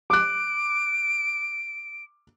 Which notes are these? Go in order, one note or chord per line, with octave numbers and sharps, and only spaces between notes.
D6 F#6 D7